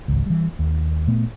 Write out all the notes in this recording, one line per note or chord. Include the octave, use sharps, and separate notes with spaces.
G#1 C#2
E3 G3
D#2
A#2 A3 B3